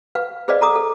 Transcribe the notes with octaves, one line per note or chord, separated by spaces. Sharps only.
B4 F5
G#4 B4 C5 D5 D#5 F5
A4 A#5 D6 D#6
A4